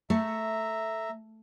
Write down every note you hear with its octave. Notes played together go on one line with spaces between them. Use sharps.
A3 E5 A#5